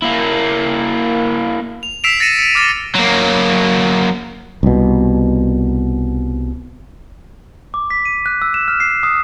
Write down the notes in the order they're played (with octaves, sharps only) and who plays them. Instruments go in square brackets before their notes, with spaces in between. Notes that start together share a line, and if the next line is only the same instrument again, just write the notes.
[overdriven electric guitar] A#3 E4
[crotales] F7
E6 B6 C7 D7 E7 F7
A6 A#6 C7 C#7 D#7 E7
C#7
D6 F6 A6
[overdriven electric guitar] F#3 A#3
[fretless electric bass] C2 B2
[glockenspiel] D6
B6
D#7
F#6
E6
E7
F6
C7
D#6